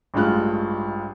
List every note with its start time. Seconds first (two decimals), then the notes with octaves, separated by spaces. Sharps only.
0.14 A1 G2 G#3 F4 F#6